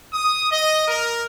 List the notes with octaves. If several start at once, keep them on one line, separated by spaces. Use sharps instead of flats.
D#6
D#5
A#4